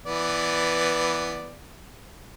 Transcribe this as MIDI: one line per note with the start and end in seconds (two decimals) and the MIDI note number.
0.06 1.52 52
0.06 1.52 59
0.06 1.52 74